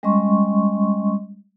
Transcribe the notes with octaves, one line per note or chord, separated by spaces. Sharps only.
G3 G#3 C#4 D#5 C6 C#6